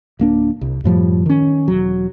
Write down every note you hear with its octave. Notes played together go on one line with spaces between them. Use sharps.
D1 A#3 D4
C2
F#2 A2 F3 G3
D#3 C#4
E1 F#3